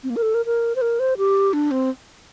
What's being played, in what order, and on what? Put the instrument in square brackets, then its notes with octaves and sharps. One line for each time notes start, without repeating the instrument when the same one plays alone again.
[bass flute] C4
A#3
A#4
A4
A#4
A#4
C5
A#4
C5
G4
D4
C4